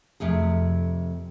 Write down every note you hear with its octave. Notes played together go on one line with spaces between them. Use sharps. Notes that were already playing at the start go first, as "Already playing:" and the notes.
F2 C3 A3 G#4